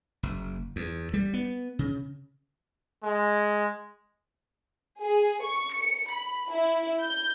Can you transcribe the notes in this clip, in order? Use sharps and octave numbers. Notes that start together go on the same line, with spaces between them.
F#1
E2
G3
B3
C#3
G#3
G#4
C#6
C#7
B5
E4
G6